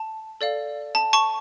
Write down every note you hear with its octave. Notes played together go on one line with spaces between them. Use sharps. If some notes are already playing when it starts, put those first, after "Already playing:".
Already playing: A5
A4 D5 F5
A5
A5 C#6